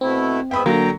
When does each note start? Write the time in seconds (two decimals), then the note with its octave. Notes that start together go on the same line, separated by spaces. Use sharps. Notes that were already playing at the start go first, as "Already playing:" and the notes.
0.01 B2 A3 C4 E4
0.51 G#2 B3 E5 G5 B5 D#6
0.66 D3 F#3 A#3 G5 A#5